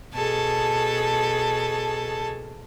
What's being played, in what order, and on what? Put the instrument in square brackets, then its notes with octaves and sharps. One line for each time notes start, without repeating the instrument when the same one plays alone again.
[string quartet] B2 G#4 A4 A5